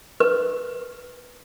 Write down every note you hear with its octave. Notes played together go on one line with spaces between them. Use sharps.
B4